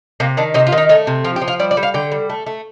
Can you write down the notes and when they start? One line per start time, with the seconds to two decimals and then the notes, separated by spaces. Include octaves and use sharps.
0.20 C3 A#3
0.37 D#3 D4
0.54 C3 D#4
0.67 F4
0.72 D#3
0.78 D#4
0.89 A3 D#4
1.07 C3
1.24 F3 F4
1.36 G4
1.42 F3
1.48 F4
1.59 G3 D5
1.71 D5
1.77 G3
1.83 F5
1.94 D3 G5
2.12 G3
2.30 A3
2.46 A3